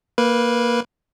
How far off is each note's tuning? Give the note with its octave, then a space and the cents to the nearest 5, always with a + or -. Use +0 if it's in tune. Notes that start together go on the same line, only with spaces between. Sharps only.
A#3 +5 B4 -10